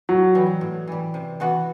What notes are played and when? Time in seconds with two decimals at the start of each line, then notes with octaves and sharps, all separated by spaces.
0.09 A2 F#3
0.35 E3 G3
0.61 A2
0.88 E3 G3
1.14 C3
1.40 E3 B3 F#4